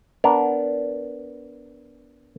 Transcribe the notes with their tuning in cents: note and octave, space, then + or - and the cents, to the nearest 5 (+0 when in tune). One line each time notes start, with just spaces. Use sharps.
B3 +0 D4 -20 A#4 +0